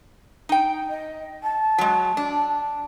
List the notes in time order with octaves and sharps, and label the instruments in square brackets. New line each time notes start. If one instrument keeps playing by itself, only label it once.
[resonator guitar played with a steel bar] D#4 G5
[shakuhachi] D#5
A5
[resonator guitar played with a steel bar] F#3 G#3
D4